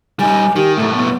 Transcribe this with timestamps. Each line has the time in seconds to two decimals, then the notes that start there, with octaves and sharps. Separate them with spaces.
0.20 G3 D#4 G#5
0.56 D#3 G4
0.78 B1 A2 A3
0.94 B3